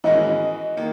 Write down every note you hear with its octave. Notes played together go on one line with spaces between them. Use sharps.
E3 G#3 C#4 F#4 A#4 D#5
D#3 A#3